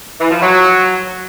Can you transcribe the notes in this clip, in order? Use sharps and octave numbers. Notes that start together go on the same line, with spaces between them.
E3
F3
F#3